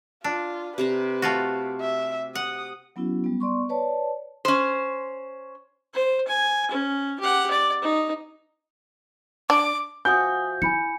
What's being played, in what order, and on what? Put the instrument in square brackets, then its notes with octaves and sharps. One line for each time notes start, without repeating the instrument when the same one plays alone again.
[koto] D4 [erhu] F4
[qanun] C3 C5 A#5 [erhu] B4
[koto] A3 F4 F#4
[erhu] E5
[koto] F#5 [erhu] D#6
[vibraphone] F#3 B3 C#4 E4 F#4
G3 B3
B3 D5 C6 C#6
B4 C#5 D5 A5
[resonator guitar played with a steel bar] C#4 C5
[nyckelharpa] C5
G#5
C#4
G4 F#5
D5
D#4
[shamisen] D4 [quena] D6
[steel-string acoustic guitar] F3 F#4 E5 [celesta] G#5 D#6 [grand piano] G6
[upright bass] E4 [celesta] G#5 B5 C#7